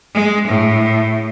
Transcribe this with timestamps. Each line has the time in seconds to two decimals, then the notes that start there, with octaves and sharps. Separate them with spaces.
0.14 G#3
0.47 A2